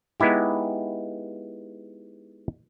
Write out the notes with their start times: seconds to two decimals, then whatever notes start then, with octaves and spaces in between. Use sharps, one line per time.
0.20 G#3 B3 D#4 E4 G4